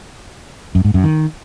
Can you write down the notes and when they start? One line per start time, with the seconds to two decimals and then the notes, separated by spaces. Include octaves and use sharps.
0.75 F#2
0.85 G#2
0.94 F#2
1.04 D#3